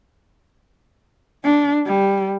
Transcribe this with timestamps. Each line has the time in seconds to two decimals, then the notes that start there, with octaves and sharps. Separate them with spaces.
1.44 D4
1.86 G3